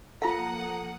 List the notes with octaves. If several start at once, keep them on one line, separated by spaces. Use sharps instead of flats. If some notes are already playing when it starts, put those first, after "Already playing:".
F3 A#3 F4 A4 F5 F#5 A#5 D#6